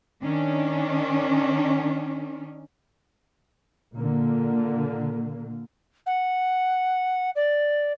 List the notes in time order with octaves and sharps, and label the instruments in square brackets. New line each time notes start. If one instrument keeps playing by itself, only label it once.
[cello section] D#3 C#4 D4
[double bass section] A#2 D3 A#3
[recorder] F#5
D5